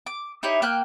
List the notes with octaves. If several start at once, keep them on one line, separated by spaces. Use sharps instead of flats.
D6
D#4 E4 G4 C#5
A#3 G5 F6 F#6